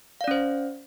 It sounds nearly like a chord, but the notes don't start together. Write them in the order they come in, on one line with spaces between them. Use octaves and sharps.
F5 D5 C#4 C5